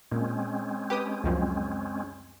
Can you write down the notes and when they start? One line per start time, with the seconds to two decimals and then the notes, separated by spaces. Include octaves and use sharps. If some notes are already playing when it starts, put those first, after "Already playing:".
0.12 A#2 G#3 C4 C#4
0.90 G4 B4 D#6
1.24 C#2 F#2 F3